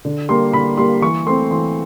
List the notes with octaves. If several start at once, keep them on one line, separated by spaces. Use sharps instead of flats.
D3
G3 A#3 C6
D3 B5
G3 A#3 C6
E3 C#6
A3 C4 C6
E3 C6